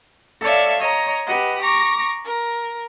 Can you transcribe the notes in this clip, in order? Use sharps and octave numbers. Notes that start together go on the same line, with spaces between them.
A4 C#5 D5 E5 F5
C#5 D#5 A#5
G4 B4 D#5 F#5
A#5 C#6 D6 A#6
A#4